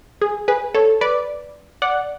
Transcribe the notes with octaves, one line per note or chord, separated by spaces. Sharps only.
G#4
G#4 B4
A4 C#5
B4 D5
D5 F#5